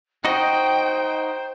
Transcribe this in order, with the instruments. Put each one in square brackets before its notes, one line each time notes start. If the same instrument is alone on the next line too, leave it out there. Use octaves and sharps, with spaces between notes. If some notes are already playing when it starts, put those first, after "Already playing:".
[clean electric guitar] D#4 F#4 D#5 [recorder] C5 [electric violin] G5